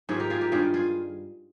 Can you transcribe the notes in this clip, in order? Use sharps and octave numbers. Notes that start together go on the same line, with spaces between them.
G#2 D#3 G3 F4 G#4
G4 A#4
F4 G#4
G4 A#4
G2 D#3 G3 F4 G#4
F4 G#4